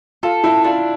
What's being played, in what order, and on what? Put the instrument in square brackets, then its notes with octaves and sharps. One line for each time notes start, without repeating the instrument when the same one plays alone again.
[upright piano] F4 [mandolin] A4
[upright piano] E4
[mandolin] D4 [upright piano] F4